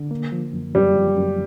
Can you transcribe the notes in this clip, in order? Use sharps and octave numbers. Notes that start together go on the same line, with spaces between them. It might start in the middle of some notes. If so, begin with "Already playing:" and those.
Already playing: D3
A#3
F3
F#2
F#2 G3
F3
F#2